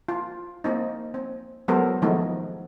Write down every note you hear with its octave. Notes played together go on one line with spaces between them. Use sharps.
F4
A#3 C4 D#4
C4
F#3 G#3 B3 A4 A#4 C5
D#3 F3 G#3 A3 B3 D#4